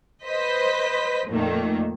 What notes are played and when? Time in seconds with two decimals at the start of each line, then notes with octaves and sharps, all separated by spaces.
0.25 B4 C5 D#5 B6
1.28 F2 A#2 D#3 A3 A#3